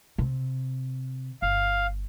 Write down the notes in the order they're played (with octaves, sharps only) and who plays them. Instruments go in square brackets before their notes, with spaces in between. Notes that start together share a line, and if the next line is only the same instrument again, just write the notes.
[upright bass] C3
[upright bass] G1 [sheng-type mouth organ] F5